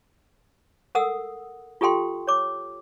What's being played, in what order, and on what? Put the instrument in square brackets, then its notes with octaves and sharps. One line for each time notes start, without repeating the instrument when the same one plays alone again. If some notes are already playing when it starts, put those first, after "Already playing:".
[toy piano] A4 A#4 F#5 D#6 E6
F4 G4 A4 G5 C6
C#5 D6